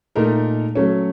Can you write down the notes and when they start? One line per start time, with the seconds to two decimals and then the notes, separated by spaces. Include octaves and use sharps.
0.16 A#2 A3 D#4 A#4
0.75 F#3 A3 C#4